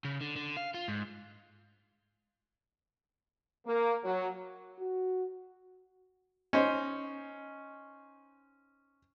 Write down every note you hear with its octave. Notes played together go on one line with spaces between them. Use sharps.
C#3
D3
D3
F5
F4
G#2
A#3
F#3
F#4
C#4 D#4 C5